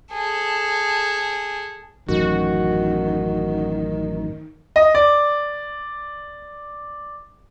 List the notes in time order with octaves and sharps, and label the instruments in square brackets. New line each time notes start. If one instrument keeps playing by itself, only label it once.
[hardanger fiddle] G#4 A4
[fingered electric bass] A1 F#2 [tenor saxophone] D#3 [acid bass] F#4
[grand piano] D#5
D5